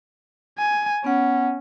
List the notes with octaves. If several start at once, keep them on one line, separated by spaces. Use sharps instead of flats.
G#5
B3 C#4 F#5